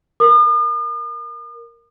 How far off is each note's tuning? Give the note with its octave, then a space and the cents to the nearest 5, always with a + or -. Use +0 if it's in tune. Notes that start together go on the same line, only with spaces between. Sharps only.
A#4 +0 D#6 -45